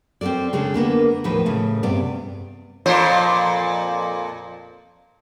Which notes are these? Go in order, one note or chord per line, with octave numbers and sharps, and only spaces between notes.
C4 C#4 F#4 A4 D5
C#3 G#3 D4 A4
D3 A#3 B3 D4
D#2 A2 F3 D#4 B4
A2 C#3
G2 C3 B3 D5
F2 A#2 C5